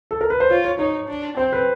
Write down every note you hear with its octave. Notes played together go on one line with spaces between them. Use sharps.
A4
A#4
B4
C5
F4 C#5
C#5
D#4 C#5
D4
C4 C5
B4